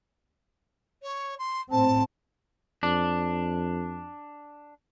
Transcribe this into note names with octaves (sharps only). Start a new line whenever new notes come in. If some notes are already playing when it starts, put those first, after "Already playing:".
C#5
C6
A2 C4 A5
F2 D4